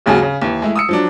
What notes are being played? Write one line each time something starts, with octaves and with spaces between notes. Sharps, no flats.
G#1 D#2 C#3 F#3 F#4 G#4
C#3
D#2 E3
G#3 A3 E4
D#6 E6 C#7
F3 F#3 D4